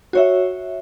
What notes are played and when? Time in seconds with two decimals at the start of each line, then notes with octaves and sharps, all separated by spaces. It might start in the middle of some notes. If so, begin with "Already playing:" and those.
0.13 F#4 C#5 E5